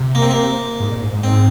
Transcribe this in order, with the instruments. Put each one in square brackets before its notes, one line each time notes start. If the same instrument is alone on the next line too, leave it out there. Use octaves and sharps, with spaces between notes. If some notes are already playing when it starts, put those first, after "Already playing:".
Already playing: [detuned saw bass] C3
[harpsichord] A#3
C4
A#3
[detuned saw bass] G#2
A#2
G#2
G#2
[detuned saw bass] G#2 [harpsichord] C4